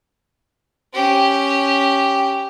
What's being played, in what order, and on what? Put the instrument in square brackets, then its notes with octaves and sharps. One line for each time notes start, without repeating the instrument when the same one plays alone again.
[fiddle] C#4 G4